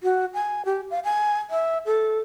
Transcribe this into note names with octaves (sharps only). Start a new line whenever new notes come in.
F#4
G#5
G4
F5
G#5
E5
A4